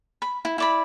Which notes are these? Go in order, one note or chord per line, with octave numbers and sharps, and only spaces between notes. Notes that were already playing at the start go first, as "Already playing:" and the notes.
B5
E4
E4 D5 B5